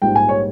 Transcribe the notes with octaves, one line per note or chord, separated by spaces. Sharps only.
A#1 G#2 G3 G5
G#5
C#5